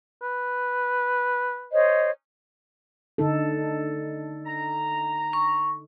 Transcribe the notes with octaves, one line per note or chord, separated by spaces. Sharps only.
B4
C5 C#5 D#5
D3 D#4 A4
A#5
C#6